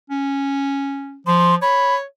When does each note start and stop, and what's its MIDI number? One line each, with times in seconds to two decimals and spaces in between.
0.10 1.20 61
1.27 1.57 53
1.27 1.55 84
1.62 2.04 73
1.62 1.95 83